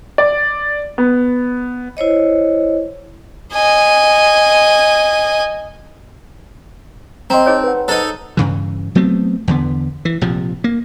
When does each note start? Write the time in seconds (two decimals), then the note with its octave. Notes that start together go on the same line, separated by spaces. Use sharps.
0.18 D5
0.98 B3
1.97 E4 C5 C#5 D#5
3.53 D#5 G#5
7.30 C4 C5 D#5 A#5 C6
7.46 D#4 G#4 C#5
7.64 B4 F#5
7.88 D#4 A4 C5 A#5
8.37 G2 C#3 E3
8.95 F#3 A3 B3 C4
9.48 E2 D3 B3
10.05 E3
10.21 A#1 C3 F3
10.64 A#3